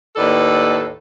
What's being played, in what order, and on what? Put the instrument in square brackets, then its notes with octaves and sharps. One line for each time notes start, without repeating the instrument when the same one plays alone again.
[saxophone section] D#2 A2 A4 B4 D5